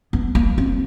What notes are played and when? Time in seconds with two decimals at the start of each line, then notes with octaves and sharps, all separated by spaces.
0.13 B3
0.35 A#3
0.58 C4